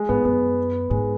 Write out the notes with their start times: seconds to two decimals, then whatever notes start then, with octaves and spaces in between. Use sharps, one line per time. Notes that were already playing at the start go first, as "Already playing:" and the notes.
Already playing: G#3
0.09 G#2 B3
0.25 F#2 B3
0.90 G#2 G#3